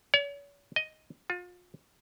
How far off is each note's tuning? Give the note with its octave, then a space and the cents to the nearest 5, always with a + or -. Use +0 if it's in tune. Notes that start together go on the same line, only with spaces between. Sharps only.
C#5 +40
D#5 +5
F4 +35